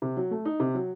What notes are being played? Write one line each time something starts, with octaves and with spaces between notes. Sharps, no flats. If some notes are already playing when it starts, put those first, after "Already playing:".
C3
F#3
A3
D#4
C3
F#3